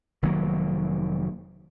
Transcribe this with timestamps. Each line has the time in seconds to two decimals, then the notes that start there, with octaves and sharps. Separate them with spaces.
0.22 F1 D#3 F#3 A#3